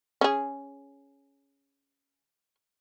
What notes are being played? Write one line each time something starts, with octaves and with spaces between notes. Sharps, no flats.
C#4 G#4